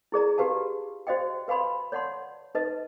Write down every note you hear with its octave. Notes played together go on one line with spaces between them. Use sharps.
E4 G#4 D5 A#5
F#4 G4 B4 F5 A5
F#4 C5 D5 D#5 F5 G5
B4 F5 G#5 B5 C6
C#5 D5 F#5 A5 C6
D#4 B4 D#5 A5